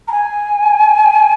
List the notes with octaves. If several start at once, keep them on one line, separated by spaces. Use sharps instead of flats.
A#5
G#5